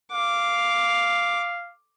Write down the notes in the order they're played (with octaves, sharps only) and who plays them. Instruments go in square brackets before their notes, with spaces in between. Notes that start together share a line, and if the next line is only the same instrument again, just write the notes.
[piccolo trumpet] F5 [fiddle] D6